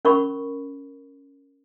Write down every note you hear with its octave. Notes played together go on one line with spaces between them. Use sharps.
C#4 A#4 B5 C#6